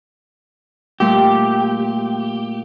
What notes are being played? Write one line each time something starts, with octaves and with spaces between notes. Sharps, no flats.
A#2 G3 A3 G4